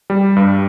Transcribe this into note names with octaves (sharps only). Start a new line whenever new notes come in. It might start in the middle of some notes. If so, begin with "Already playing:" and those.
G3
G2